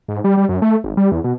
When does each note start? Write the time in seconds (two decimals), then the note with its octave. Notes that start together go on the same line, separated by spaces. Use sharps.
0.08 G#2
0.24 G3
0.37 G3
0.49 F#2
0.62 A3
0.84 G#1
0.97 G3
1.12 E2
1.24 B2